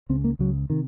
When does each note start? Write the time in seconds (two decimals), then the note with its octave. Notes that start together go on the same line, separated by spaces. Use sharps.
0.09 C#2 C#3 C4
0.24 A#3
0.39 C#2 C#3 F#3
0.70 C3 D#3